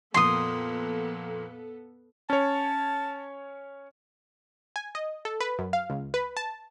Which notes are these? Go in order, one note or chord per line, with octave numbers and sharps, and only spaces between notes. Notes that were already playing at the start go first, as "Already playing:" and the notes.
F2 A#2 B3 A4 C6 D#6
C#4 C#5 A5
G#5
D#5
A4
B4
F#2
F5
C#2
B4
A5